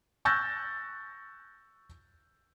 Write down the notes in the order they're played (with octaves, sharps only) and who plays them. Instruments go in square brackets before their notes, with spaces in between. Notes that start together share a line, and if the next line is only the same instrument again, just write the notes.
[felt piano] C#6 E6 F#6 G6 A6 A#6